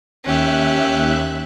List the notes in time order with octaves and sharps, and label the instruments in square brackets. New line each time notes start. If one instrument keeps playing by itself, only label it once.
[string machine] D#2 E5 F#6 [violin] C#4 G4